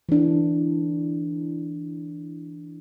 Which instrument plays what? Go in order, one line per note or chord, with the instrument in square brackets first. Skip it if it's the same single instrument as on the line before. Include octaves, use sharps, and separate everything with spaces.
[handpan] E3 D4